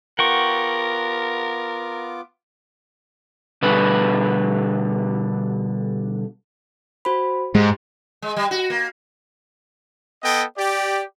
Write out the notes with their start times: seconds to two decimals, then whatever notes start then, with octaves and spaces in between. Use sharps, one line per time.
0.19 B3 F4 A#4 F#5 G5 C#6 D6
3.62 B2 D3 G3 B4
7.05 F#4 C5 B5
7.55 G#2 G#3 G4
8.22 G#3
8.36 G3
8.51 F#4
8.70 A#3
10.23 B3 A4 D#5 G5
10.58 G4 D5